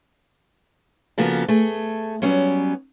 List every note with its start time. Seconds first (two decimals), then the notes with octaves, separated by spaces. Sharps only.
1.18 C#3 F3 A#3 B3 F#4 A4
1.48 A3 G#4
2.22 F#3 G3 B3 C#4